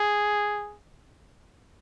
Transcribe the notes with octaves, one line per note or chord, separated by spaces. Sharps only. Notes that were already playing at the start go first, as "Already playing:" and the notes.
Already playing: G#4